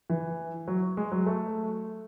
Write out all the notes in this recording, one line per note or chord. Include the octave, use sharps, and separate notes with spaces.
E3
F#3
G#3
F#3
A3